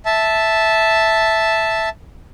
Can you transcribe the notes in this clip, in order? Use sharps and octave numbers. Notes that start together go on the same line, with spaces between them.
E5 A5